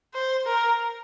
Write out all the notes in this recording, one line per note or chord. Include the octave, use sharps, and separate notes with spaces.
C5
A#4